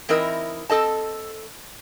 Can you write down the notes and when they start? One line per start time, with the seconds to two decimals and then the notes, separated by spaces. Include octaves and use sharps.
0.09 E3 C4 D#4 E4 A#4 D#5
0.70 C4 A4 D#5 A5